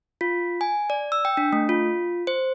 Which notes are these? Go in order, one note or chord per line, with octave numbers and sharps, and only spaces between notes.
F4
G#5
D5
E6
G5
D4
A3
F4
C5